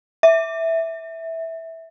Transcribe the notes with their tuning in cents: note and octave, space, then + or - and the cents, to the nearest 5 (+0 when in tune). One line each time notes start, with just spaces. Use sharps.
E5 -10